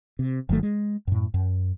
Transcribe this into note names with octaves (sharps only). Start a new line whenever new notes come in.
C3
G1 D#3 F#3 A3
G#3
F#2 A2
F#2